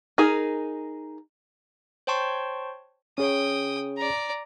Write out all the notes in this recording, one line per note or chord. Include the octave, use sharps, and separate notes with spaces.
D#4 G#4 A#4
C5 C#5 G5 A5 C6 C#6
C#4 G#4 C#5 G5 D#6
D5 A#5